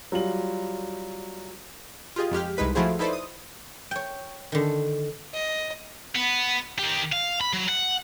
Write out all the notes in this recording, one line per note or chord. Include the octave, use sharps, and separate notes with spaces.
F#3 G3 F4 F#7
F4 G4 G#4 D#5
F2 G#3 G4 F6
C2 G#3 D#4 B4 B6
F3 A3 E4 F#4 G#4 C5
D#4 E4 A4 B4 C5 D5
D#6
C#5 G5
D3 D#3
D#5
B3
D#3 G4
F5
B5
F#3
F#5